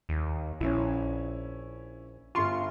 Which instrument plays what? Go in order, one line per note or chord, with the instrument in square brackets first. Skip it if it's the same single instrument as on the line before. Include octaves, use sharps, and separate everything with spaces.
[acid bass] D#2
[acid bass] A#1 [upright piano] C#4 E4
[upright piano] G1 C6 C#6 [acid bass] F4